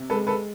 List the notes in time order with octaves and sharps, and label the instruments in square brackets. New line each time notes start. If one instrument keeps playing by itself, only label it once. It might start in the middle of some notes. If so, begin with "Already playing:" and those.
Already playing: [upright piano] C3
G#3 A4 B4
A4 B4